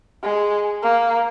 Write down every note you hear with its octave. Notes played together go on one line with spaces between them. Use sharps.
G#3
A#3